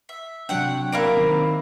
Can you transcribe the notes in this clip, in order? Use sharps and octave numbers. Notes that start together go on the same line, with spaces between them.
E5
C3 F#3 D4 C#5 F#5 G5
A#3 E4 A#4 D5 F5 D7
D#3 C4 D#4